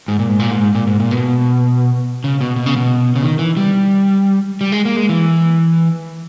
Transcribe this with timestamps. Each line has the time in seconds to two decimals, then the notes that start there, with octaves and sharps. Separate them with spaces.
0.08 G#2
0.19 A#2
0.29 G#2
0.39 A#2
0.51 G#2
0.75 A#2
0.87 G#2
1.00 A#2
1.11 B2
2.24 C#3
2.41 B2
2.56 B2
2.66 C#3
2.76 B2
3.16 C#3
3.23 D#3
3.39 E3
3.57 G3
4.61 G3
4.72 G#3
4.85 A#3
4.97 G#3
5.09 E3